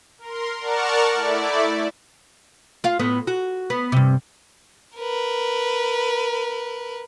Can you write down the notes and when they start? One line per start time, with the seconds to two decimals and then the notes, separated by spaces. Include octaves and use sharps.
0.18 A#4 C6
0.59 A#4 D5 F#5 A5 C#6 F6
1.14 A3 E4 D5
2.84 F4 F5
2.99 A2 B3
3.27 F#4
3.70 B3
3.92 G2 C3
4.97 A#4 B4